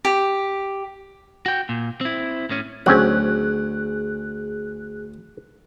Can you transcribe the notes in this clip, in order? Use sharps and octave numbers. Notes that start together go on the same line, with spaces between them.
G4
F#4 G5
A#2
C4 E4
A2 C#4
D2 F#3 C4 C#4 G#4 F#6